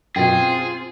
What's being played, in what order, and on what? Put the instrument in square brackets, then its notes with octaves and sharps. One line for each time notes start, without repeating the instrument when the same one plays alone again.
[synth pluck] F#2 B2 [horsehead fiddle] C4 F4 [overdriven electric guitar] G#4 [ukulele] G5